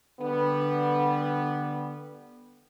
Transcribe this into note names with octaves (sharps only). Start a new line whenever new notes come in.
D3 G3 B3